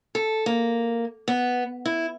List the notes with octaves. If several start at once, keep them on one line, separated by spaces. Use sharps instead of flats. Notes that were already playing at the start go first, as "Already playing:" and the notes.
A4
A#3
B3
E4